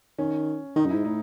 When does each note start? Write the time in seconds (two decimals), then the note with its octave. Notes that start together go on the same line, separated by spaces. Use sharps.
0.18 D#3 C#4
0.76 D#3 D#4
0.86 F#2
0.90 G#2 E4
1.05 A2 D#4